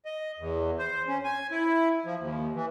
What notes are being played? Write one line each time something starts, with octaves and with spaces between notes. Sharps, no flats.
D#5
E2
C5
C#4
G#5
E4
F3
D#2
E3